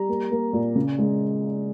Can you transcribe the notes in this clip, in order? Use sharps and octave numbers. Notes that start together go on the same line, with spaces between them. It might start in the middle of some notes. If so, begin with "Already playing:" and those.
Already playing: G3 A#5
A#3
A#3
A#2
C#3
G#3